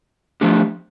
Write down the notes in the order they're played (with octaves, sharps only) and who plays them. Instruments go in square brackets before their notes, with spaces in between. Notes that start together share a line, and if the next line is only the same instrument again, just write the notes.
[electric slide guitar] F3 A3 D4 G4